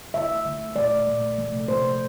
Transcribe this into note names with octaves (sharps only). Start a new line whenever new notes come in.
D3 A3 E5
D3 A3
A#2 A3 D5
A#2 A3
C3 F3 A3
C3 F3 A3 C5